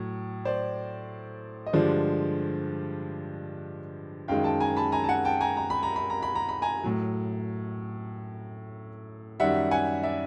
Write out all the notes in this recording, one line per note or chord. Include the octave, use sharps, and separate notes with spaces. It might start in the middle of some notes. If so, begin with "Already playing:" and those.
Already playing: A2 F#3
C5 D5
D#5
G2 D3 F3 G#3 C5 D5
F#2 D#3 G#3 F5 G5
G5 A5
G#5 A#5
A5 B5
G#5 A#5
A5
F#5 G#5
G5 A5
G#5 A#5
A#5
B5
A#5
B5
A#5
B5
A#5
B5
G#5 A#5
A2 F#3
F#2 D#3 G3 E5 F#5
F#5 G#5
D5 E5